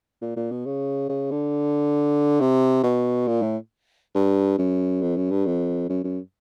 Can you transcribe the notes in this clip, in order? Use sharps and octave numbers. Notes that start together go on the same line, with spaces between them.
A#2
A#2
B2
C#3
C#3
D3
C3
B2
A#2
A2
G2
F#2
F2
F#2
G2
F2
F#2
F#2